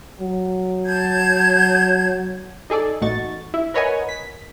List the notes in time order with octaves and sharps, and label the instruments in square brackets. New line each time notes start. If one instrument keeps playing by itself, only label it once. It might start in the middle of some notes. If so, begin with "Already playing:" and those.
[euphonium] F#3
[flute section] A5 G6 G#6
[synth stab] D#4 G#4 A4 D5
A1 A3 D#4 F#4 C#6 A6
E4
A#4 B4 C#5 D#5 F#5 G#5
B6